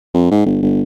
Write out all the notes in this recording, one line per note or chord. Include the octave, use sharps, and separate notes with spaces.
F2
G#2
G1
G1